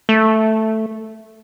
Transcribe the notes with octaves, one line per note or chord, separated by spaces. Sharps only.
A3